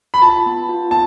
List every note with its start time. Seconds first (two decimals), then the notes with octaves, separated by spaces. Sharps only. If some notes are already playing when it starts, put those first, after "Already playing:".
0.14 B5
0.22 F4 A5
0.46 B3
0.69 F4
0.91 B3 A5